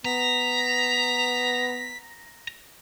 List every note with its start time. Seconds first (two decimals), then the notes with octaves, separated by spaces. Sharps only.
0.05 B3 A#5 B6